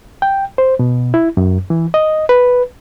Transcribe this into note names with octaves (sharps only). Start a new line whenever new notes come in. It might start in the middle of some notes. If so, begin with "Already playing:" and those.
G5
C5
B2
E4
F#2
E3
D#5
B4